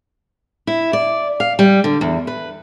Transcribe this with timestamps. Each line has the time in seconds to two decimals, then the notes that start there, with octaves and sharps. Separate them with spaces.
0.67 E4
0.93 D5
1.40 F5
1.59 G3
1.84 D3
2.01 E2
2.27 B4